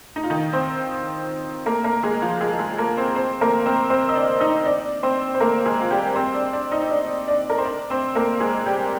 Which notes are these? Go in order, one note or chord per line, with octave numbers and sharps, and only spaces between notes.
D#4
F4
D#3 D#4
C4 C5
A#3 A#4
A#3 A#4
G#3 G#4
F3 F4
G#3 G#4
G#3 G#4
A#3 A#4
C4 C5
C4 C5
A#3 A#4
C4 C5
C4 C5
D#5
D4 D5
D#4 D#5
D4 D5
C4 C5
C5
A#3 A#4
G#3 G#4
F4
G3 G4
C4 C5
D4 D5
D4 D5
D#4 D#5
D4 D5
D4 D5
A#4
C5
D4 D5
C4 C5
A#3 A#4
G#3 G#4
G3 G4